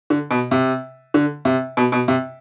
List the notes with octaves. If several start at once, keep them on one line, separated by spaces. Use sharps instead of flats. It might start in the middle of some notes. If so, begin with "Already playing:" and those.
D3
B2
C3
D3
C3
B2
B2
C3